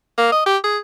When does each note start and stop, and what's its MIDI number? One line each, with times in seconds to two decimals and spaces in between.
0.18 0.29 58
0.32 0.42 75
0.46 0.57 67
0.64 0.78 68